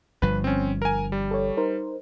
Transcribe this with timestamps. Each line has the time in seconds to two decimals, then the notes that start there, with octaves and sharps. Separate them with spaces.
0.22 G1 G2 F3 B4
0.44 C4 C#4
0.82 A#4 G#5
1.12 G3
1.31 A4 C#5
1.57 D#4 A#4 C5